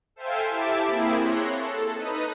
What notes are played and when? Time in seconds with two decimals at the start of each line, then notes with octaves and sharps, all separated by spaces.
0.16 A4 C5 E5 F5 G5 G#5
0.48 E4 G4 E5 A5 D6
0.86 A#3 C4 E4 G#4
1.19 C#5 C6 F#6 A#6
1.53 A4
1.95 D#4 B4 D#6